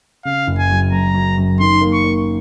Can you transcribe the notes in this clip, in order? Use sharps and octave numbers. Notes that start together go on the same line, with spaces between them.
C#3 F5
F#1
G#5
F#3
F#2 A#5
F#3
F#2
D#3 C6
A#3
C#6
A#3